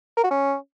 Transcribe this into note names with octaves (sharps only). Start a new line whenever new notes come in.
A#4
F#4
C#4